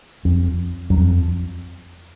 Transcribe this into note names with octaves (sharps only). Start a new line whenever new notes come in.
F2
F#2
F2